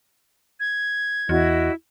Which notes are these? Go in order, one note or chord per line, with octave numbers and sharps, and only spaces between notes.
G#6
E2 E4 F#4 D#5